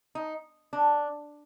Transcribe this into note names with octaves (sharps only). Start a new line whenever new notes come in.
D#4
D4